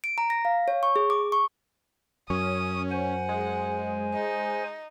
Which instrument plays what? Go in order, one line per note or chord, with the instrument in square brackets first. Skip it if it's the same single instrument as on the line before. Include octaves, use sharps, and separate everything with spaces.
[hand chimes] D7
A#5
A#6
F5
C#5
C#6
G#4
D6
C#6
[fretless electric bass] F#2 [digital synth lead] C#4 [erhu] D#6
[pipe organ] C5 G#5 [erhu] F#5
[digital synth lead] G#3
[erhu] D#4